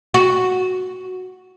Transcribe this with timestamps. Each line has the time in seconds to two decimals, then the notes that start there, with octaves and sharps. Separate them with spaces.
0.14 F#4